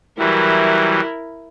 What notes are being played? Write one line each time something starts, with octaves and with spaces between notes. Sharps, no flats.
E3 F#3 G3 E4 A#4